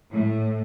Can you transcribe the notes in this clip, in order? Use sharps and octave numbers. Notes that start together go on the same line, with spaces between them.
A2